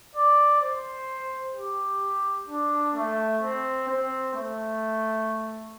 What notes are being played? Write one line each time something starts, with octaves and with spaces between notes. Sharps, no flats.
D5
C5
G4
D4
A3
C4
C4
A3